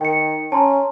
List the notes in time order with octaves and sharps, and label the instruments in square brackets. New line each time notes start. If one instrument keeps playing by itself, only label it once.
[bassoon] D#3 [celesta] G5 C#7
[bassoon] C#4 [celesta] A5 A#5 C6